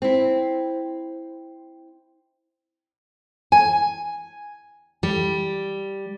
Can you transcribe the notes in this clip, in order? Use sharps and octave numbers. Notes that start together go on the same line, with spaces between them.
C4 E4
G#5
G3